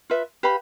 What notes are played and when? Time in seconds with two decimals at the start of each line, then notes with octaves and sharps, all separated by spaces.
0.10 F4 B4 E5
0.43 G4 B4 F5 B5